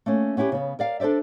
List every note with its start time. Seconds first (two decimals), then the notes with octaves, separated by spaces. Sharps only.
0.06 A3 A#3 C#4
0.37 B3 C#4 E4 F#4 G4
0.52 C#3 B3
0.79 A#4 D5 F5
1.00 D4 A4 C5 D5 E5